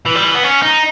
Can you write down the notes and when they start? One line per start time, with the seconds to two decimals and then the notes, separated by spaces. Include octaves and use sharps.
0.06 E3
0.15 G3
0.24 E3
0.35 B3
0.44 C#4
0.62 D#4